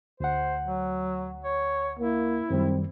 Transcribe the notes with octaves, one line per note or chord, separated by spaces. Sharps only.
D2 C5 F#5
F#3
C#5
A#3 E4
F#2 D#3 G3 C4